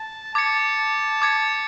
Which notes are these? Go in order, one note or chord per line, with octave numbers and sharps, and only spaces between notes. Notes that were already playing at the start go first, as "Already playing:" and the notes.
Already playing: A5
A5 D6 G#6 C#7
D6 G#6 C#7